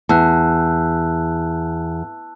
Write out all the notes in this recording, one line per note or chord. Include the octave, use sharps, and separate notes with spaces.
E2 A5 E6 F#6